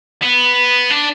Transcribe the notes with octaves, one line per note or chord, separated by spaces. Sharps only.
B3
D4